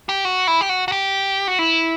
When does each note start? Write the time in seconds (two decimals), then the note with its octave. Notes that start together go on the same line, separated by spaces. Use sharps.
0.09 G4
0.25 F#4
0.47 E4
0.61 G4
0.69 F#4
0.88 F#4
0.92 G4
1.48 F#4
1.59 E4